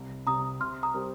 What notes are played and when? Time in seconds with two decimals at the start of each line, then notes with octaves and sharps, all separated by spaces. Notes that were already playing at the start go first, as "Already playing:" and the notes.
Already playing: C2
0.26 C3 G3 A#5 D#6
0.60 C3 C6 F6
0.83 A#5 D#6
0.94 G3 C4 G4 A#4